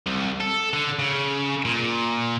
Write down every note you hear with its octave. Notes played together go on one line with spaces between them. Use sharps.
C2
A4
D3
C#3
A#2